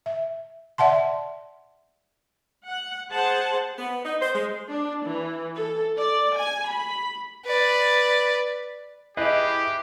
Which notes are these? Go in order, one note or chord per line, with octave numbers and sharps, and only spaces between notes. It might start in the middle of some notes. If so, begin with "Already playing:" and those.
E5
D5 E5 F#5 A5 C6
F#5
G#4 C5 F#5 A5
B3
D#4
C5
G#3
D4
E3
A4
D5
G#5
B5
B4 D5
E4 G4 G#4 B4 D#5